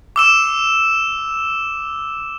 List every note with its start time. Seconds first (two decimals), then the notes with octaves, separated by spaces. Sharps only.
0.16 D6 E6 E7